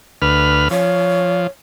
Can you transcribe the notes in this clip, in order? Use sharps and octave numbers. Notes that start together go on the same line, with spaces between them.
D2 B4 F6
F3 C#5